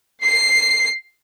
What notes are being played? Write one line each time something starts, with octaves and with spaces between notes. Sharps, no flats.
C7